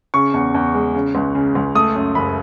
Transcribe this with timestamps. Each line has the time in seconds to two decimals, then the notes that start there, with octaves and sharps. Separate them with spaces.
0.14 C#3 C#6
0.34 E2
0.54 E2
0.74 G#3
0.94 C#3
1.15 C#2
1.35 C#3
1.55 C#2
1.75 A3 D#6
1.95 F#2
2.15 F#1 B5